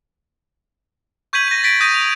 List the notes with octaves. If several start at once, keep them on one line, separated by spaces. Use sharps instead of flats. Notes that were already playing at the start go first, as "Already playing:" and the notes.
C#6 G6 G#6 B6 D#7 F#7
A#6 D#7
A6 B6 D7
D#6 G6 A#6 D#7
F7